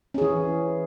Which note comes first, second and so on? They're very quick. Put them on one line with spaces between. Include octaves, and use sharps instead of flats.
C#4 G#4 E3